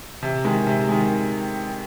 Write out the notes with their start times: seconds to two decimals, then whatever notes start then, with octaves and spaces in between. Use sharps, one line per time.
0.22 C3
0.45 D#3 G#3
0.67 C3
0.89 D#3 G#3